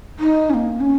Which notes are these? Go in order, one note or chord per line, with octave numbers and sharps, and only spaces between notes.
D#4
C#4
A#3
C#4